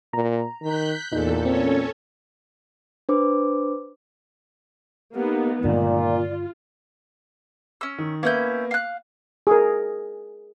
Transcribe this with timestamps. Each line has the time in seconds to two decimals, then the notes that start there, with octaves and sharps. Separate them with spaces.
0.13 A#2 A#5
0.62 D#3 F#6 G6 B6
1.12 E2 A#2 D#4 G#4 A4
1.45 C4 C#4 A4 C#5
3.09 D4 B4 C5 D6
5.15 A#3 B3 D#4 G4
5.64 G2 A#2 D3 D#3 G#3 D5
5.96 F4
7.81 C#4 E6
7.98 D#3
8.23 A#3 B3 C#4 E4 G6
8.71 F5 F#6
9.47 G#4 A#4